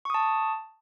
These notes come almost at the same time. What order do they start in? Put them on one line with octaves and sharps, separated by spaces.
C#6 D#6 A5